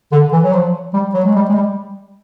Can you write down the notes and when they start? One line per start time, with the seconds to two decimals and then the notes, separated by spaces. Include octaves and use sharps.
0.12 D3
0.32 E3
0.44 F#3
0.53 F3
0.93 G3
1.14 F#3
1.24 G#3
1.35 G3
1.49 G#3
1.54 G3